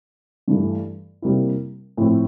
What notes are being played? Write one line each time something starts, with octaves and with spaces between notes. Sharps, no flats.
G2 E3 A3
C3 G3 A#3 E4
A2 F3 C4 E4